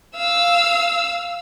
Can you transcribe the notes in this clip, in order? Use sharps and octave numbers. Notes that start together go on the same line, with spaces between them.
F5 E6